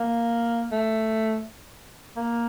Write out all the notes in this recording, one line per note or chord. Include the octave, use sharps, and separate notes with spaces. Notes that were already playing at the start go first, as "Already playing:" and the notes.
Already playing: A#3
A3
A#3